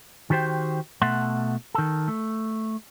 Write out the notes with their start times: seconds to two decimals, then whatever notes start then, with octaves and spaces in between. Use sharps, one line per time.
0.30 D#3 F#4 G4 C5 G5
1.02 B2 A3 E5 F#5 C6
1.75 D#3 A4
2.08 A3